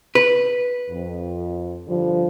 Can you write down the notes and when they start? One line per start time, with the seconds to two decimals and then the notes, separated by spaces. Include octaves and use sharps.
0.15 B4
0.89 F2
1.87 G2 D3 F3